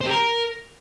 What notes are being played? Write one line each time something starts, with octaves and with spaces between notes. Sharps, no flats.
C5
G4
A#4